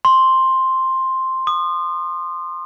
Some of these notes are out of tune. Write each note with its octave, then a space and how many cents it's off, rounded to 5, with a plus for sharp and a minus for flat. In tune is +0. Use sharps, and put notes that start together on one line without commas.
C6 +5
D#6 -35